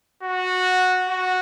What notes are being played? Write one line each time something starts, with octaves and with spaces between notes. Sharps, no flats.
F#4
F#4